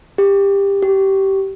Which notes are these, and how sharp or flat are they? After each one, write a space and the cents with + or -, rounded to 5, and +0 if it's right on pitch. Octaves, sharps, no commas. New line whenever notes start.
G4 +20
G4 -20